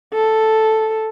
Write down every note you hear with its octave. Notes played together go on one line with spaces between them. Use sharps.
A4